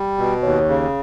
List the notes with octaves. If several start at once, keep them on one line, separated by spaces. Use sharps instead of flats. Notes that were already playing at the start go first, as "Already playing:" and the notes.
Already playing: G3
B2
D#2 C#5
C#3